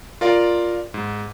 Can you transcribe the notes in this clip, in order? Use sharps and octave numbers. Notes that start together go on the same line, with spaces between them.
F4 A#4 D5 F5
G#2